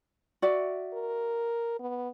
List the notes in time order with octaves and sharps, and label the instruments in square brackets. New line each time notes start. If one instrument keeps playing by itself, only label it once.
[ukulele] F#4 D5 E5
[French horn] A#4
B3